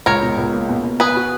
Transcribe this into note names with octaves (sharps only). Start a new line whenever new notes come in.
C#2 A#4 C#5
B2
C#2
A#3
B2
B2
B3 G#4 B4
F#4